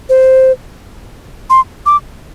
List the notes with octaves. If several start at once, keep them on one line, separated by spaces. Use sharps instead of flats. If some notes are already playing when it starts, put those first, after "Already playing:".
C5
C6
D6